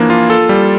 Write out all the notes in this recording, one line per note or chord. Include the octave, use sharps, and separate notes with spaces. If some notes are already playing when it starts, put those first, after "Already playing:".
Already playing: E3 F3 A#3 D4
F4
A4
G3